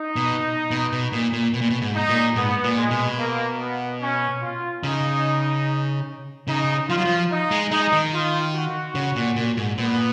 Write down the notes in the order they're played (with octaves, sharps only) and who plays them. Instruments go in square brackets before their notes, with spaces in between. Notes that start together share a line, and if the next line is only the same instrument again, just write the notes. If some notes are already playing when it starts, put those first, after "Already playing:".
Already playing: [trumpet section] D#4
[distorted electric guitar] B2
B2
B2
A#2
A#2
B2
A#2
B2
G#2
[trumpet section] D#4
[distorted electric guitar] A#2
[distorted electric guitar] G#2 [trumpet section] B3
[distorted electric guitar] A#2
[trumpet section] G#3
[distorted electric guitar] B2
[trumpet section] A#3
B3
C#4
F4
[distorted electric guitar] C#3 [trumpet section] D#4
[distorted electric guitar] C#3 [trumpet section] D#4
[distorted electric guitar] F3 [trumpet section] F4
[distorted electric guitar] F#3
F3
[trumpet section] D#4
[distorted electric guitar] G#3
[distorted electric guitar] G#3 [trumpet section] D#4
[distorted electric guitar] D#3
[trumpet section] F4
F#4
[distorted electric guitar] C#3
A#2
A#2
G#2
[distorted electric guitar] A#2 [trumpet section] B3